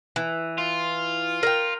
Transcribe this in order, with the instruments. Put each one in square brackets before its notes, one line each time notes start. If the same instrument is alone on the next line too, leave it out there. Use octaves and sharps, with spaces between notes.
[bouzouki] E3
[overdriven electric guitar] F4
[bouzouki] A#4 G5